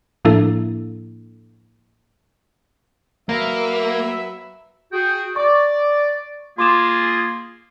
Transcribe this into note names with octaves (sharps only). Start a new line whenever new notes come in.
A2 F3 A#3 D4 E4 A4
F#3 A#3 B4 E5
F#4 G#4 G5
D5 C#6 D6
A#3 F4 G#4 C6 D6 E7